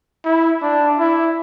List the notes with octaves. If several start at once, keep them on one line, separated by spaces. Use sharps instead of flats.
E4
D4
E4